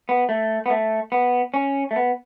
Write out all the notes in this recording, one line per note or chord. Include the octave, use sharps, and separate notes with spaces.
B3
A3
B3
A3
B3
C#4
A3
B3